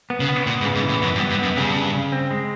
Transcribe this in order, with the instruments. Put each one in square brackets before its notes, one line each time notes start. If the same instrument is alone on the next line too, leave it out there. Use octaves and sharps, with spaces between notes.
[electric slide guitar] B3
[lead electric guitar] C#3
[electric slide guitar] B3
[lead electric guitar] A#2 [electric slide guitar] B3
[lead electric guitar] G#2
[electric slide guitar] C#3
[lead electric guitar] G#2
[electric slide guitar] E3
[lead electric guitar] A2
[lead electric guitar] F#2 [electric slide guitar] B3
[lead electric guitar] G2
[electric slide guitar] B3
[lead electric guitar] G2
[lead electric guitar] F#2 [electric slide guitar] B3
[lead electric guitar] G2 [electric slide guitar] C#3
[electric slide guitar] C#3
C#3
C4
G#3